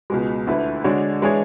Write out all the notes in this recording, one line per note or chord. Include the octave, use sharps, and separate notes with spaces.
C#2 B2 G#3
D2 D3 A3 E4 B4
D3 G#3 D4 F#4 C#5
E3 G#3 D4 G#4 C#5